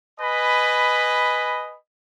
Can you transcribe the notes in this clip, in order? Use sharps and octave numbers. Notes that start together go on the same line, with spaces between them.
B4 D#5 G#5 B5